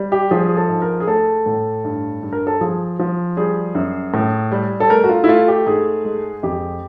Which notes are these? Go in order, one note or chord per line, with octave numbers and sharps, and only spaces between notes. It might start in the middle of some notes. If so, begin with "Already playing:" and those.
Already playing: G3
G4
F3 G#4
G#4
A4
G#2
A#4
G#4
A3 A4
A2
G2
G2
A#4
A4
F3 G#4
F3
G3 G#4
F#2
A2
G3
A4
A3 A#4
F#4
F4
E4
A3 F4
G4
G#2 G#4
G#3
F2 G4